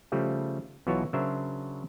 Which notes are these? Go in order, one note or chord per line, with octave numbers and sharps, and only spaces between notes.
C#3 F3 G3 A3
B1 B2 E3 F4 F#4 C#5
C#3 F#3 D4 A#4 C5 E5